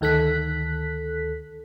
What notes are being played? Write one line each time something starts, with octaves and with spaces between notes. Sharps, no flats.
D2 D#3 A4 F#6 B6